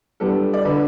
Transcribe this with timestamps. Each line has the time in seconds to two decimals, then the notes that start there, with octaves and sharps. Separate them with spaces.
0.20 G3 B3 D4 A4
0.53 D5
0.65 D3 B4